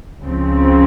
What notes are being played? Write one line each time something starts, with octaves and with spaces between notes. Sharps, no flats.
C#2 C#3 F3 C4